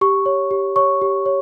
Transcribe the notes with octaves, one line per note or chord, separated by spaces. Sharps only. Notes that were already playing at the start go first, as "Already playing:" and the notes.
G4 C#6
C#5
G4
C#5 C#6
G4
C#5